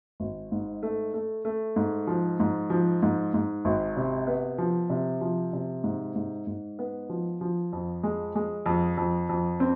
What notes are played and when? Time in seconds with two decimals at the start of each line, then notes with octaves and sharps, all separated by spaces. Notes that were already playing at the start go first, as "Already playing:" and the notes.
0.20 G#1
0.52 G#2
0.83 A3
1.14 A3
1.45 A3
1.76 G#2
2.07 F3
2.40 G#2
2.70 F3
3.02 G#2
3.34 G#2
3.65 G#1
3.97 C3
4.27 B3
4.58 F3
4.90 C3
5.21 F3
5.53 C3
5.84 G#2
6.15 G#2
6.47 G#2
6.79 B3
7.09 F3
7.41 F3
7.73 F2
8.03 G#3
8.35 G#3
8.66 F2
8.97 F2
9.29 F2
9.60 C4